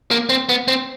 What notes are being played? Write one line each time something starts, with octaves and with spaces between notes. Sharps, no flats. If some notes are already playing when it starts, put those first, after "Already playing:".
A#3
C4
B3
C4